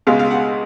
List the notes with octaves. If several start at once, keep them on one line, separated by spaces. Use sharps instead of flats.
C#2 B2 G#3 F5
F5
F#5